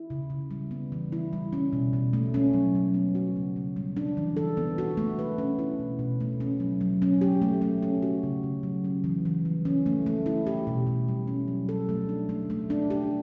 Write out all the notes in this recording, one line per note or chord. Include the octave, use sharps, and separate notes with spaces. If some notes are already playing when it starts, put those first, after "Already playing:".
Already playing: E4
C#3
C#3
G3
B3
E3
E4
G3
C#4
B2
B2
A3
C#4
F#3
F#3
B3
F#4
C#3
C#3
G3
D4
E3
A4
B3
F#4
A3
B4
C#4
E4
B2
B2
A3
C#4
F#3
F#3
C#4
G4
A3
A3
C#4
F#4
C#3
C#3
F#3
C#4
E3
E3
G3
C#4
A3
A3
E4
G4
B2
B2
G3
C#4
F#3
A4
A3
D4
A3
A3
D4
G4